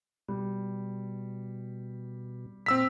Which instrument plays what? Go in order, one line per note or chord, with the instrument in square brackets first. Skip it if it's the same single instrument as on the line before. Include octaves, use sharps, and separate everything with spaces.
[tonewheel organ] B2 [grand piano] G3
[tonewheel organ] A#2 F6 [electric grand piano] C4 E6 B6